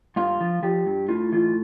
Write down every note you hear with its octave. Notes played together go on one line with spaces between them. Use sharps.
G2 F4
F3
F3 G4
G2
A2 F4
E3 F4